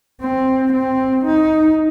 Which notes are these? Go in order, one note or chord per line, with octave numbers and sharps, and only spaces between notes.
C4
C4
D#4